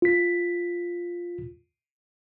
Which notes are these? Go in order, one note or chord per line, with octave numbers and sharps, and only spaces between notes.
F4 B6